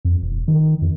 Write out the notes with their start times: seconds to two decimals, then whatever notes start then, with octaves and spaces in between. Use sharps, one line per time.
0.05 F2
0.22 E1
0.48 D#3
0.82 F2